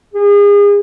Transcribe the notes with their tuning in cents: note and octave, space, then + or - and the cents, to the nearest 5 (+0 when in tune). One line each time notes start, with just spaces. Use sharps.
G#4 -35